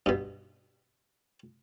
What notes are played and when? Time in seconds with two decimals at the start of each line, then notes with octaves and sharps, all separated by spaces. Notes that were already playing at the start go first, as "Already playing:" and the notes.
0.06 G2 B2